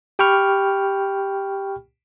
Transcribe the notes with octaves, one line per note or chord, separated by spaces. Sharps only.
G4 G5 B5 C#6 F6